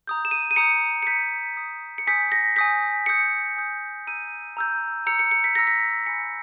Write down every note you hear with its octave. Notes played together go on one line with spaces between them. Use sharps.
A#5 D#6 G6
E7
D#7
D#7
A#5 D#6 G6 C#7
C#7
A#5 D#6 G6 B6
A#5 D#6 G6
C#7
G#5 D#6 G6 B6
A#6
G#5 D#6 G6 B6
G#5 D#6 G6 C#7
G#5 D#6 G6
A#5 E6 G6 D#7
A#5 E6 G6
A#5 E6 G6 C#7
C#7
C#7
B6
A#5 E6 G6 A#6
B6
G#5 B5 G6 C#7